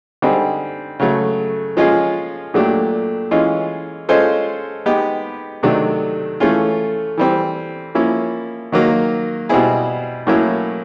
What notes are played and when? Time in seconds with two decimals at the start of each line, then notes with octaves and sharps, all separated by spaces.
0.22 D3 G3 C4 D#4 G#4
1.00 C#3 F#3 A3
1.77 F3 G#3 C#4 F4 G#4
2.54 A#2 F#3 A3 D4 G4
3.31 E3 G#3 C#4 F4
4.09 G#3 C#4 F4 A4 C5
4.86 G#3 B3 D#4 G4 B4
5.63 C3 D#3 F#3 A3 D4
6.40 E3 A3 C#4 F4
7.17 E3 G3 C4
7.95 F3 A#3 C#4 E4
8.72 D#3 F#3 A#3
9.49 B2 G3 C4 E4 G#4
10.27 A2 F#3 A#3 C#4 E4